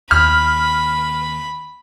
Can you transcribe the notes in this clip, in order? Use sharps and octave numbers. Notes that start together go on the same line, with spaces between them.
D#2 B5 F6